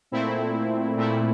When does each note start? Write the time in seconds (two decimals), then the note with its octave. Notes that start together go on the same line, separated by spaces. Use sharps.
0.12 A#2 A3 C4 E4
0.97 A#2 A3 C4 E4